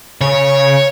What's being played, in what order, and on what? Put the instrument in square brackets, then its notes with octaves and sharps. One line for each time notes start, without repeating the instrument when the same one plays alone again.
[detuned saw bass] C#3 [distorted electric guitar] C#5